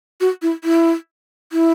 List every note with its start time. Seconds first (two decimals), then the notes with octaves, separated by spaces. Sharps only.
0.21 F#4
0.42 E4
0.64 E4
1.52 E4